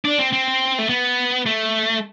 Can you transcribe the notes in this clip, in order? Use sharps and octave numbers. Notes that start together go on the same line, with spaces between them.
D4
C4
C4
A3
B3
A3